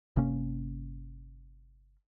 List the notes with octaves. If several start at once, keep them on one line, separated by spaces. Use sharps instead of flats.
G1 C3 A#3 C#4